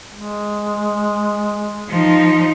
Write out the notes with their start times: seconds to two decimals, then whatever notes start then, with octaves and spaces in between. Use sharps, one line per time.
0.12 G#3
1.89 F3 D#4